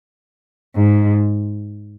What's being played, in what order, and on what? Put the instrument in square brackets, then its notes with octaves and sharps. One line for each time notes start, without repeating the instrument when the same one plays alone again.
[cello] G#2